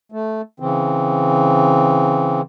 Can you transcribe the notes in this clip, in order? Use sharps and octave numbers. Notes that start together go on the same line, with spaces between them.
A3
C#3 E3 C4